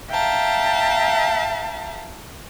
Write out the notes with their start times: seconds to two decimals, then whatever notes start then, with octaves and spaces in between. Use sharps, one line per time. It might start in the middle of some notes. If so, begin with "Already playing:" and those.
0.10 E5 F5 G5 A5 A#5